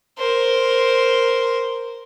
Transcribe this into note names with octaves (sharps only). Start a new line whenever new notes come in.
A#4 C5